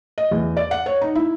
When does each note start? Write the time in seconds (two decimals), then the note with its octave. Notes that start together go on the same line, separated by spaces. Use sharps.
0.18 D#5
0.31 E2
0.57 D5
0.71 F#5
0.86 C#5
1.01 D#4
1.15 E4